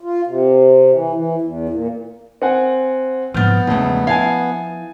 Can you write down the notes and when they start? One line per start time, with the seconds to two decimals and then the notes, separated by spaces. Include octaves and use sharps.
0.01 F4
0.27 C3
0.92 E3
1.13 E3
1.42 E2
1.69 A#2
2.42 C4 F#5 G#5
3.34 G#2 F3 B3 F6 G6 A6
3.67 E1 C#3 F3 A3 C#4
4.07 E4 F5 G#5 A5 G#6